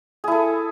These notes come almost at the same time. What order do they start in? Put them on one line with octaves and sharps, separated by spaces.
G#4 E4 A4